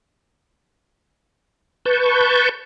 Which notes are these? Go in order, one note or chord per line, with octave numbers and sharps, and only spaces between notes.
B4 A5 C#6 G6